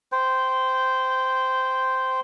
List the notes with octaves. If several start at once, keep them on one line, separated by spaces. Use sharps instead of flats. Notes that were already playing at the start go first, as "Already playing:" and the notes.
C5 G5